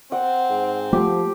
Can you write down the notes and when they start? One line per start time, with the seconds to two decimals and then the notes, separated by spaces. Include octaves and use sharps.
0.12 C4 F#5
0.50 G#2
0.93 F3 A3 G4